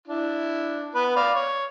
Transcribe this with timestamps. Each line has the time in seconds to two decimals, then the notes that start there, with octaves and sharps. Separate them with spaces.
0.07 D4 E4
0.95 B3 B4
1.16 D5 F5
1.35 C#5